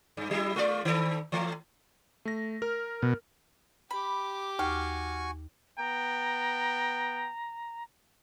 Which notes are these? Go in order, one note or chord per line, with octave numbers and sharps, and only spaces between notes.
G2
F#3 E4
G#3 F4 D5
D#3 A4
E3 A3
A3 A#6
A#4 F6
B2
G4 B5 D6
D#2 F#4 F5 G#5 C#6
B3 G5 A#5